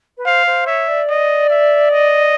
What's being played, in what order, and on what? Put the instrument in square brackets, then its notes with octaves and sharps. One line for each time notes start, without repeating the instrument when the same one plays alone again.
[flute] B4
[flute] C5 [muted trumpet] F5
[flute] C5
[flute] C#5 [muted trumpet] E5
[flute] D5
[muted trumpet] D#5
E5
D#5